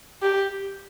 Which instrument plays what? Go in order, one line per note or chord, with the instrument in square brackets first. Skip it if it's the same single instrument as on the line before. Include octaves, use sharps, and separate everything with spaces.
[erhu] G4